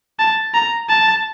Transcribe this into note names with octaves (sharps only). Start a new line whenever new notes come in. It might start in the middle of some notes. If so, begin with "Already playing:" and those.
A5
A#5
A5